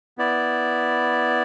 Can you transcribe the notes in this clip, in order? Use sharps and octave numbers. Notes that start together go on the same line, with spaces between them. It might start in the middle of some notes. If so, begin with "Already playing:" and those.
B3 E4 D5